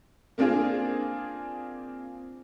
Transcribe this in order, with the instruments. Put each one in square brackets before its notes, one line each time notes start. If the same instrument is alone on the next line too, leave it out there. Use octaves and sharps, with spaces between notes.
[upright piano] A#3 C4 D4 F4 G#4